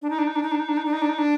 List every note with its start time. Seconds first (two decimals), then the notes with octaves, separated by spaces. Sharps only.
0.02 D4
0.10 D#4
0.19 D4
0.27 D#4
0.36 D4
0.43 D#4
0.51 D4
0.59 D#4
0.68 D4
0.77 D#4
0.85 D4
0.93 D#4
1.02 D4
1.09 D#4
1.18 D4